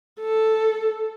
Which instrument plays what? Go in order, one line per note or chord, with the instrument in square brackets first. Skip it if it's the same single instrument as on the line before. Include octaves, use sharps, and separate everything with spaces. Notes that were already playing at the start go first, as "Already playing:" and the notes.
[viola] A4